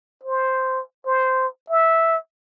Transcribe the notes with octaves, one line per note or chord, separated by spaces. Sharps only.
C5
C5
E5